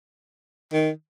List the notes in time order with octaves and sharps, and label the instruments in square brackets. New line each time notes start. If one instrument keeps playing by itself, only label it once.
[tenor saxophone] D#3